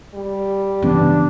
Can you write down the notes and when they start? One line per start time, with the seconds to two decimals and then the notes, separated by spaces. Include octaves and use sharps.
0.14 G3
0.82 G2 C#3 E3 B3 D4